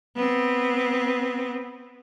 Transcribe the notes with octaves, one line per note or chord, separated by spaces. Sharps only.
B3 C4